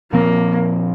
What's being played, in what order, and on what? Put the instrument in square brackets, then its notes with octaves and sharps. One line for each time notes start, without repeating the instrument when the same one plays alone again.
[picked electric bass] A#2 F3 C4 [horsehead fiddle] A#3